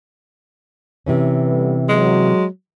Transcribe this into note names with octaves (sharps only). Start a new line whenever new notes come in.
C3 E3 C#4
D3 G3 B3
F#3 G#3